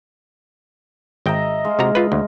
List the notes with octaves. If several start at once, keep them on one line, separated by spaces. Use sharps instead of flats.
G#1 D#5 E5 G5 A#5
G#3 F5
C3 F#4 A#5
F4 B4
D2